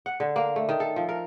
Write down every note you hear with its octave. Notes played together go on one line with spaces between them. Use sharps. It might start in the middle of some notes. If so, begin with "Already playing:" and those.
F#5
D3
A#3
A3
D#3
A4
F3
A#4